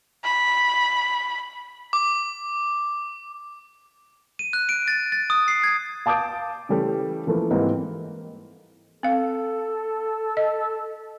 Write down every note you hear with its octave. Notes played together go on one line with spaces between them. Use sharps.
B5
D6
D#7
F#6
D7
A6
A6
D#6
C7
G#6
F5 A5 D6 D#6 G6 D7
C#3 E3 G3 A3 G4
E3 F3 A3 A#3
G#2 E3 G3 A#3 C4
C4 A4 F5
D#5